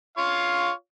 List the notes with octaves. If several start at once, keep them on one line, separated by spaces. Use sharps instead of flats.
F4 C#5 F5